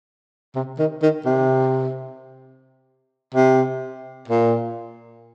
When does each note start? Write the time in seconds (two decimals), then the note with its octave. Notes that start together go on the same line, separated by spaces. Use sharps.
0.55 C3
0.79 D#3
1.03 D#3
1.25 C3
3.34 C3
4.28 A#2